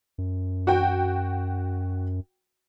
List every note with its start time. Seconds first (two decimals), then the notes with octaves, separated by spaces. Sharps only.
0.18 F#2
0.67 F#4 G5